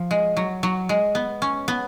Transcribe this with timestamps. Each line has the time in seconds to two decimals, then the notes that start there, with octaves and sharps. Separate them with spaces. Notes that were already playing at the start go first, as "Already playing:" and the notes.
Already playing: F3
0.11 G#3
0.37 F#3
0.63 F#3
0.89 G#3
1.15 B3
1.42 C#4
1.68 B3